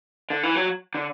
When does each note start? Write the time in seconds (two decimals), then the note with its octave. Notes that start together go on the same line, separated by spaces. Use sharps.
0.30 D3
0.43 E3
0.55 F#3
0.95 D3